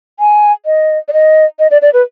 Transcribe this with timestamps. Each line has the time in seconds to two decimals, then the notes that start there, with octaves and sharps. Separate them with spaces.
0.19 G#5
0.66 D#5
1.08 D5
1.13 D#5
1.59 D#5
1.71 D5
1.82 D5
1.93 B4